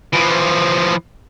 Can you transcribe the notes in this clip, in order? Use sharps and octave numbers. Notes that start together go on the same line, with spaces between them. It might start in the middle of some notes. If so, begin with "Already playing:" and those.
E3 F3